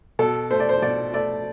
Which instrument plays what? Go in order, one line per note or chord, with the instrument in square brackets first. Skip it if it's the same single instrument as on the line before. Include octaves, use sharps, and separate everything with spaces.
[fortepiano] B2 A4
A3 C5
D5
C5
B2 D5
A3 D5